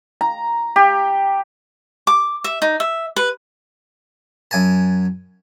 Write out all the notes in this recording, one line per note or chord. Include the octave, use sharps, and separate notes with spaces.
A#5
G4
D6
E5
D#4
E5
B4
F#2 G#5 A5